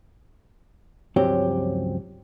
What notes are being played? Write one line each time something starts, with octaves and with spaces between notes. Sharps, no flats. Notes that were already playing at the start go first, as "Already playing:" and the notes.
C#2 G2 F3 F#3 C4 G4